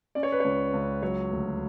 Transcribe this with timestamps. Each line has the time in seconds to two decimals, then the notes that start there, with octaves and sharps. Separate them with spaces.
0.15 C#4 D5
0.23 C#5
0.32 B4
0.40 C#2 C#5
0.73 C#2
1.02 F#3 C#5
1.31 D2